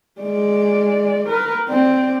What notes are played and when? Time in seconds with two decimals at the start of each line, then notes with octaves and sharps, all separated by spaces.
0.21 G#3 D5
1.28 A#4 B4
1.69 C4 D5